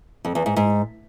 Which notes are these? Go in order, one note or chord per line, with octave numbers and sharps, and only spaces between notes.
F2
E2
G#2
G#2